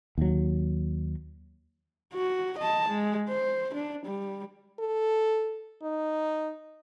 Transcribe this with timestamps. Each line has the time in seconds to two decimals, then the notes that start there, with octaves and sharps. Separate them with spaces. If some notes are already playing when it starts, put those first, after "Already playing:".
0.18 D#2 F#3
2.13 F#4
2.58 D#5 A5
2.89 G#3
3.29 C5
3.74 D4
4.05 G3
4.80 A4
5.83 D#4